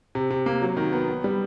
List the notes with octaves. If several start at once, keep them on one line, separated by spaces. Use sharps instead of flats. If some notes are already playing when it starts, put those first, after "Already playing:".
C3
C3
A#3
F#3
D#3
B3
B3
G3